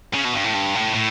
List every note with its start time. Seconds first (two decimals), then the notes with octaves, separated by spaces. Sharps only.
0.14 C#3
0.25 B2
0.34 G2
0.44 A2
0.54 G2
0.75 A2
0.94 A2